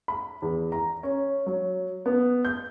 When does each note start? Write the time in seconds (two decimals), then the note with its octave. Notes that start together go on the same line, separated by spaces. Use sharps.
0.08 B5
0.42 E2
0.72 A#5
1.03 C#4
1.46 F#3
2.06 B3
2.45 G6